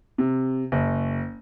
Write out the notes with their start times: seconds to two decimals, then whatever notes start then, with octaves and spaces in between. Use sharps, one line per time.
0.18 C3
0.72 F#1